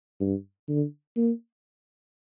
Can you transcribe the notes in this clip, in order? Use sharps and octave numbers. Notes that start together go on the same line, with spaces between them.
G2
D3
A#3